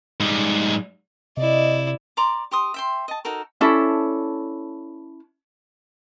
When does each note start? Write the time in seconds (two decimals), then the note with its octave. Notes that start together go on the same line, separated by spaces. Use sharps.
0.20 G#2 G3
1.37 C3 E4 D5 D#5
2.17 D5 A#5 C6 D6
2.51 G4 C6 D#6
2.74 E5 G5 C6
3.08 D#5 A5
3.25 D#4 F#4 A4 A#4
3.61 C#4 D4 E4 A4